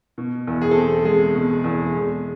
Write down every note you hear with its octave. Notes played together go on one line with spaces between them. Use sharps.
B2
E2
G#4
A4
C4 G#4
G#3 G#4
B2
E2
G#3